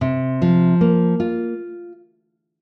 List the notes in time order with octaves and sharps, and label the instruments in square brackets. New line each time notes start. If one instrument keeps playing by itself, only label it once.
[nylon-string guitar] C3
F3
A#3
F4